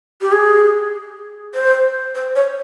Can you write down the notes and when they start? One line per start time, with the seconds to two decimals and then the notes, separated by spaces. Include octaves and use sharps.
0.21 G4
0.32 G#4
1.55 C5
2.15 C5
2.36 C#5